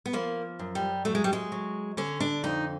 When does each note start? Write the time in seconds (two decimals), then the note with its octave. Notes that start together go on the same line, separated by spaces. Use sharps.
0.06 B3
0.13 F3 A#3
0.59 F#2
0.75 G3
1.05 F#3 A3
1.15 G#3
1.24 G3
1.33 G#3
1.52 F#3
1.97 D3 C#4
2.20 D4
2.44 F2 D#4